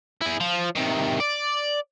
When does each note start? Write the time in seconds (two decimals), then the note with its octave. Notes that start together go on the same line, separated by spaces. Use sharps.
0.21 E4 G#4
0.40 F3
0.76 C3 D#3
1.20 D5